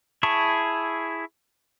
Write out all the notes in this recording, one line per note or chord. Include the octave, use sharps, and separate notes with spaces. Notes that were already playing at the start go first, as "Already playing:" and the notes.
E4 G#4 A5 C#6